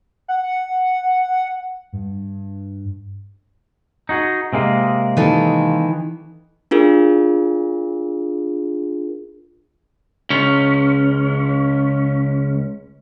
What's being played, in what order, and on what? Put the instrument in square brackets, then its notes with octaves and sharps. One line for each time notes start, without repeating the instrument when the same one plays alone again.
[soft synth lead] F#5
G2
[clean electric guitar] D#4 F#4 G#4
C3 G#3 A#3
[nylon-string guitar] D#3 E3 A4
[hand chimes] D4 F4 G#4 A#4
[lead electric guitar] C#2 C#4